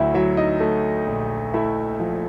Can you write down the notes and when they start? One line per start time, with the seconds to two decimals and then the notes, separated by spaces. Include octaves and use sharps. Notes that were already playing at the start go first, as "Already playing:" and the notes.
Already playing: D2 F#3 E4 F#4 E5
0.14 F#3 E4 E5
0.37 D#4 D#5
0.60 A3
1.07 A#1
1.54 A3 E4 E5
2.00 F3